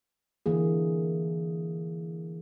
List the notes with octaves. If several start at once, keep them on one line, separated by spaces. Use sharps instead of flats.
D3 E3 A#3 G#4